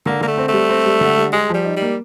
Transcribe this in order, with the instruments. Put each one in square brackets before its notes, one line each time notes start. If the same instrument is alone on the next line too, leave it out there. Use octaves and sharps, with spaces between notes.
[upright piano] D3 [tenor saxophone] A#3
[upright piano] D3 [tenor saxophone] A#3
[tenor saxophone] A3
[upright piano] C4
[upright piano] G3 [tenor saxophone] A3
[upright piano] C4
G3
D3
G3
[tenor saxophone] G#3 [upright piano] G#4
[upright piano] F3 [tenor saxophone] G3
[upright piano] D#4
[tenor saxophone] G3
[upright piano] A#3